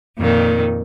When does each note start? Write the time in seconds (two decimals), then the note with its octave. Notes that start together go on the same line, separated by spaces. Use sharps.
0.19 F2 A#2 D#3